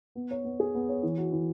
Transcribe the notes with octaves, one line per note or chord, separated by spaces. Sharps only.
B3
C#5
B3
G#4
B3
C#5
E3
F#4
E3